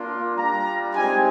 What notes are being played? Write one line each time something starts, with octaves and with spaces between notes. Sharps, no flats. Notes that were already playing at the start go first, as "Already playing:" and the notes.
Already playing: A#3 D4 F4
G3 D4 F4 A#5
G#3 C4 D#4 G4 G#5